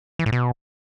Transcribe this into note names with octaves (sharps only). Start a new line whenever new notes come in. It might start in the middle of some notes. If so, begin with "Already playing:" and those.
E3
A2
B2